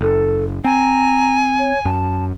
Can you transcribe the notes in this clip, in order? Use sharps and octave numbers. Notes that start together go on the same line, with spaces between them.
F#1 A4
C4 G#5 A#5
C#5
F#2 A5